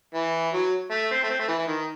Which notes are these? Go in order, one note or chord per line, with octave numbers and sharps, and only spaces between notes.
E3
F#3
A3
C4
A3
C4
A3
E3
E3
D#3